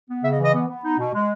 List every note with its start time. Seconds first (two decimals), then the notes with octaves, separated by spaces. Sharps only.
0.08 B3
0.23 C#3 E5
0.33 D#5
0.38 E3
0.43 D#5
0.53 B3
0.68 B3
0.83 D#4
0.98 B2
1.14 G#3